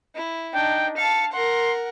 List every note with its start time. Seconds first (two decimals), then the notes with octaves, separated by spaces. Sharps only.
0.15 E4
0.53 D4 D#4 G5
0.97 F5 A5 C#7
1.32 A#4 F#5 C6